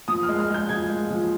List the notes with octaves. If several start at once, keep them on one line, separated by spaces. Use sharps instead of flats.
F3 D#6
F6
G#3
F6
G#3 G6
F3 G#6
G#3
F3